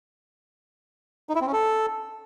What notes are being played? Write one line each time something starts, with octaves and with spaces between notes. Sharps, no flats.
D#4
E4
C4
C#4
A4